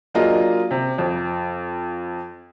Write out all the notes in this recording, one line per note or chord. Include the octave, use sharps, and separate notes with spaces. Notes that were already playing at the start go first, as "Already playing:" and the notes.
F#3 A#3 D4 F4 G#4 D#5
C3
F2